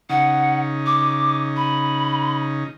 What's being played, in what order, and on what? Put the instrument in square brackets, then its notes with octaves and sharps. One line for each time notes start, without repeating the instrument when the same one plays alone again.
[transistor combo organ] C#3 D#4 [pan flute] F#5
[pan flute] D6
B5